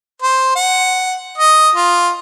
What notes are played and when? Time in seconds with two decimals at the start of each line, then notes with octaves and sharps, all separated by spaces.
0.22 C5
0.56 F#5
1.38 D#5
1.75 F4